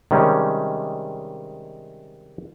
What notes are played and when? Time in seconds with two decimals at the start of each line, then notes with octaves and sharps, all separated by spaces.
0.11 C3 D#3 G3 G#3 C#4